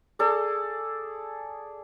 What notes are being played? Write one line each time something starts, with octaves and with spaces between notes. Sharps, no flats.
G#4 A4 D5